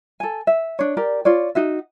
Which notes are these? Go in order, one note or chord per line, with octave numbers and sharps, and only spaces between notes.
A4 G#5
E5
D4 C#5
G4 A#4 D5
F4 C#5 D5
D#4 F#4 E5